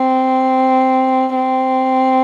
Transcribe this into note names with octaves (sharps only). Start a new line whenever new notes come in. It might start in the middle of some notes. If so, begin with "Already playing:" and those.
Already playing: C4
C4